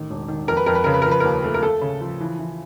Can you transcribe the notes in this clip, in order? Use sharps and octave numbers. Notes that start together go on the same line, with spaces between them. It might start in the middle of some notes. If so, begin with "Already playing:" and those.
Already playing: A1 D#3
E1
D#3
F2 A#4
B4
F2 A#4
B4
C#3 A#4
B4
F3 A#4
B4
D#2 A#4
A3
A#4
A3 A4
C#3
F3
E3
E3